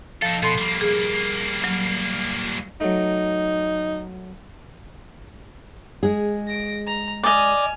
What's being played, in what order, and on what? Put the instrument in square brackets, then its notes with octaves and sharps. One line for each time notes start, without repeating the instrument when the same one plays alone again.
[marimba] F3 [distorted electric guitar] D#4 A4
[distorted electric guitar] B2 [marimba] A4 C6
[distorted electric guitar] G3 A#3
[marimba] G#4
F#3
[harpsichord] F#3 A3 [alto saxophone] D#4
[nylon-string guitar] G#3 G#4
[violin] A#6 D7
A#5
[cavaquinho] D5 D#5 [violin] G#5 F6